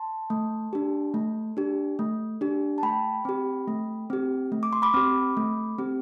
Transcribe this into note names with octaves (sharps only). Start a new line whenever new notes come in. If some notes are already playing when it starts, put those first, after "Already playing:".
Already playing: A5 C6
A3
D4 G4
A3
D4 G4
A3
D4 G4
A5
A3 G5 B5
C4 G4
A3
C4 G4
A3
D6
C6
B5 D6
C4 G4
A3
C4 G4